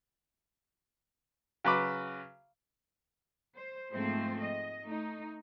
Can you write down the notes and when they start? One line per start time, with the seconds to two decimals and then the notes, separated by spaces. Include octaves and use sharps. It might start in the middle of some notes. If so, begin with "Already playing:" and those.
1.64 C#3 F#3 B4 B5 D6
3.56 C5
3.92 G#2 F3 A3 A#3 C4 C5
4.40 D#5
4.81 A3 D#4